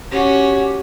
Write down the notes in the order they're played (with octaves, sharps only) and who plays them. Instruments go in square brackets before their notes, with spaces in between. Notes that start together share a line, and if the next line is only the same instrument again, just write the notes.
[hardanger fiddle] C#4 F#4 [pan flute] G4